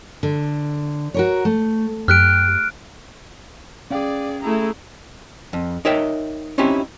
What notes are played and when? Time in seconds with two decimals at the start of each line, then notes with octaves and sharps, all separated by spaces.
0.23 D3
1.14 F#4 A#4 C#5
1.45 A3
2.08 F#2 G4 F6 F#6 D7
3.90 C#4 G#4 D5 F5 G5
4.43 A3 E4 G#4 A#5
5.53 F2
5.85 D#4 A#4 C#5 E5 G5
6.58 C4 C#4 D#4 E4 G4